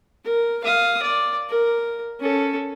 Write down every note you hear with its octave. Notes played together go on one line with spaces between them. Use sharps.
A#4
F5 D#6
D5
A#4
C#4 A4